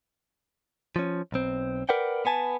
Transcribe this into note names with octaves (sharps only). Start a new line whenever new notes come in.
F3 C#4
B1 C4
A#4 B4 D5 F#5 G5
B3 B4 G#5 A5